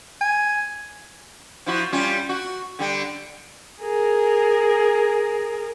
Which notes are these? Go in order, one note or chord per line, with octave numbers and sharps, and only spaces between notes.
G#5
F3 E4 F#4
G3 C#4 F4
F#4
D3 G3
G#4 A#4